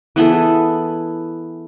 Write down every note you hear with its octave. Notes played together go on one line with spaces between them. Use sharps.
E3 B3 G#4 A4